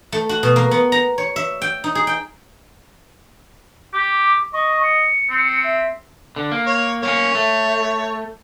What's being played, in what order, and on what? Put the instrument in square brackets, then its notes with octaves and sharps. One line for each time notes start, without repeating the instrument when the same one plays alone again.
[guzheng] A3
F#4
B2
A#3
B3
A#5
C#5
E5
G5
D#4
G#4
G5
[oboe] G4 [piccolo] D6
[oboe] D#5 [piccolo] C#6
[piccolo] C#7
[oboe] C4
[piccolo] E5
[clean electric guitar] D3
A#3
[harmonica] C#5
[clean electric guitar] A#3 B3 C#4 [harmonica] C#5
[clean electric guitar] A3